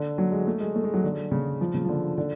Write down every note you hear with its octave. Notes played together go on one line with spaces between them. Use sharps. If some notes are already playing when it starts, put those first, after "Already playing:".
Already playing: D3
F#3
G#3
A3
G#3
A3
G#3
F#3
D3
C#3
F3
C#3
F3
D3
D3